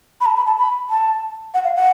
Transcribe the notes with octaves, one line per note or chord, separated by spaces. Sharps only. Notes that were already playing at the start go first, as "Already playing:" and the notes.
B5
A5
B5
A5
B5
A5
F#5
F5
F#5